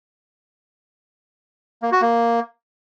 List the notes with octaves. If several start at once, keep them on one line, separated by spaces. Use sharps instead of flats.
A#3
F#4
A#3